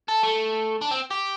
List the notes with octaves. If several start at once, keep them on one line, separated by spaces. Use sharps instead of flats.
A4
A3
D4
C4
G4